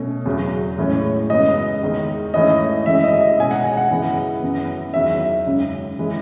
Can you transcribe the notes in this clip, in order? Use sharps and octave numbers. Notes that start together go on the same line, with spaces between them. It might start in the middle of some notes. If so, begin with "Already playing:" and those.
Already playing: B2 A3 C#4
E2 C#3 F#3
A2 E3 G#3 C#4
F#2 C#3 G#3 B3 D#5
E2 D#3 G#3
G#2 E3 A3 C#4 D#5
F#2 C#3 E3 G#3 E5
D#5
D#5
B2 G#3 C#4 G#5
F#5
G#5
F#5
F#2 C#3 E3 G#3 B3
F#2 E3 B3
E2 D#3 F#3 E5
F#2 C#3 G#3
E3 G#3